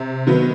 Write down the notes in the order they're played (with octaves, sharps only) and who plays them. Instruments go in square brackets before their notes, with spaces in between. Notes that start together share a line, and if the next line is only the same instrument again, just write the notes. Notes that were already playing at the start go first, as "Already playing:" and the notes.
Already playing: [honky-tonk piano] C3
D#3 F#3 B3